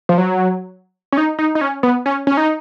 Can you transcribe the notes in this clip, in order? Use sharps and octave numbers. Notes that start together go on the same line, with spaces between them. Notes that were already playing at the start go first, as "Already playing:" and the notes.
F3
F#3
C#4
D#4
D#4
D#4
C#4
B3
C#4
C#4
D#4